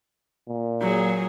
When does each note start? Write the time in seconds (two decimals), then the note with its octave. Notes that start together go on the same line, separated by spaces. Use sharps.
0.49 A#2
0.81 F#3 G#4